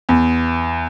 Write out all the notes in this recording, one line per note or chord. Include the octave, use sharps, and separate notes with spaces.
E2